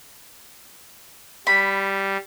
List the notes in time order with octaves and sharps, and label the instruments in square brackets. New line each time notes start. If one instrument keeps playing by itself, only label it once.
[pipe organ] G3 [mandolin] B5